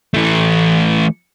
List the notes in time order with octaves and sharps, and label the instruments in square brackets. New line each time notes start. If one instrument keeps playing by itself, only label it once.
[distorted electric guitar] E3 A3